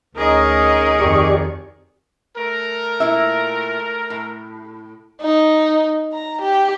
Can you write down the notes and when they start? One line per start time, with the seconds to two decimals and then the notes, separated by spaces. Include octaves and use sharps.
0.17 D2 C#4 D#4 G#4 A#4 D#5
0.99 F2 D#3 G4 D5 C#6
2.37 A3 A#4
3.00 A#2 E4 E5
4.10 A2
5.22 D#4
6.13 A#5
6.42 G4